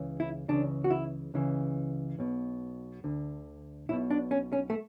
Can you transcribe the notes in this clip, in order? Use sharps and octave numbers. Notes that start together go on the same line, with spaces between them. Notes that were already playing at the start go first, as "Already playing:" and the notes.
Already playing: C#2 C#3 E3
E4
C#2 C#3 E3 D4
F#4
E4
C#2 C#3 E3
B1 B2
D2 D3
B1 B2 E4
D4
C#4
C#4
A3